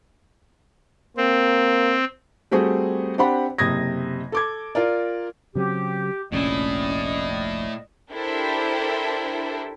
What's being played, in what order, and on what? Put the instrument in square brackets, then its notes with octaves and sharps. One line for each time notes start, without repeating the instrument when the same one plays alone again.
[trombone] A#3 [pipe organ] C4
[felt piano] G3 A3 C4 F#4 G#4
C4 D4 G4 F#5 B5
F#1 C3 D#6 G#6 A#6
A4 D6 G#6
F4 A#4 D5
[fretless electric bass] C#3 F#3 C4 [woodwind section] G4
[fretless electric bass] F1 A#1 [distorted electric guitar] A2 E4 [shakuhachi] C#4 [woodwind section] D5 D#5
[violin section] D4 E4 G4 A4 A#4 C5